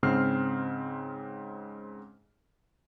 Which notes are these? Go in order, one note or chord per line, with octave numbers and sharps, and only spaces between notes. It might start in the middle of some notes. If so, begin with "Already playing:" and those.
G#2 C#3 C4 F6 C7